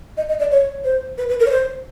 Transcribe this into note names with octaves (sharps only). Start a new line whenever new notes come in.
D#5
D#5
D5
C#5
C5
B4
B4
A#4
C#5
C5